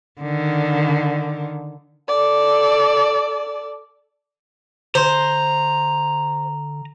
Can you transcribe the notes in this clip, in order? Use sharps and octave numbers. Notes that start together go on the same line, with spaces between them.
D3 D#3
A4 D5
D3 C5 A#5